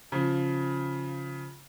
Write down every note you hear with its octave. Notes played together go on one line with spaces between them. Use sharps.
C#3 F3